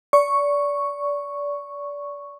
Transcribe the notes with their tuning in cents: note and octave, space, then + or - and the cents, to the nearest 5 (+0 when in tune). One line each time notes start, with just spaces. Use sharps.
D5 -25 C#6 +0